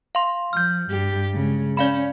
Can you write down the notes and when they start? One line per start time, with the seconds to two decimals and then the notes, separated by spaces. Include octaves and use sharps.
0.15 F5 C6
0.53 F3 F6 G6
0.89 G2 G4
1.34 C#3 G#3
1.77 C#4 D5 F5 B5